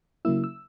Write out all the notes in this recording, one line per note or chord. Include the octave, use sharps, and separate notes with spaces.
C#3 F#3 A#3 E4 E6
E6